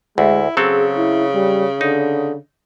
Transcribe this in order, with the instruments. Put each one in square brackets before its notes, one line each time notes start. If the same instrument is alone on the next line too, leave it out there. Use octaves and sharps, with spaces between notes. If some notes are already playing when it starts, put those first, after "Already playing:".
[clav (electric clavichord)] D2 [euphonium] G#3 [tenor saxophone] E4
[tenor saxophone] C#3 [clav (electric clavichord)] F#3 C4 A4 [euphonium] G#4
[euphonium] E4
G3
[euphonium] D3 [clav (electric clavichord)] D#4